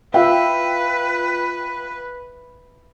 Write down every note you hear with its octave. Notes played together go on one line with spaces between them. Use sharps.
F4 B4 E5 F5 G5